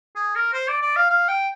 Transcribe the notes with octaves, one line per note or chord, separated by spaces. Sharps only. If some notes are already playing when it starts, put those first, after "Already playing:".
G#4
A#4
C5
D5
D5
F5
F5
G5